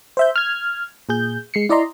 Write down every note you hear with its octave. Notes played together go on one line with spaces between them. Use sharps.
C5 E5 G6
F6 G#6
A#2 G#4 G6
G#3 C7 C#7
E4 D5 D#5 A#5 C6